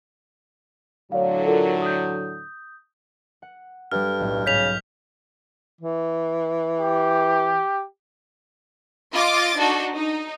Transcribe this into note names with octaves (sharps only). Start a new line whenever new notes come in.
A2 D3 F#3 C#5 D5 F5
F4 A4 A#4
D#6 G6
F#5
G2 G3 A4 F6
B1 A2
G#2 C#3 G6 B6 F7
E3
G4
F4 D#5 D6 A6
D4 D#4 F#4 A4
D#4